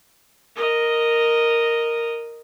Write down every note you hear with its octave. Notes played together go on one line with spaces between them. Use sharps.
A#4 D#5